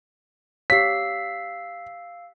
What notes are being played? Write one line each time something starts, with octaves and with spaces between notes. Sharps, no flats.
G4 C#5 F5 E6 B6 C7